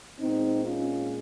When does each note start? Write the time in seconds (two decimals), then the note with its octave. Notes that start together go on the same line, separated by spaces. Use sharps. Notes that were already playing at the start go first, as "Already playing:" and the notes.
0.19 A#2 G#3 C4 D#4
0.65 C#4 F4